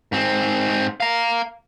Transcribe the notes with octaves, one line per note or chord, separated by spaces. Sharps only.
G#2 C4
F5 A#5